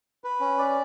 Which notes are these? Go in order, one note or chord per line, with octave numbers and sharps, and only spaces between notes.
B4
C#4
D5